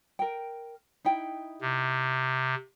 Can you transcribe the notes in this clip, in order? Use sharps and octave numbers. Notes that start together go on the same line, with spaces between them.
A#4 G5
D#4 E4 G5
C3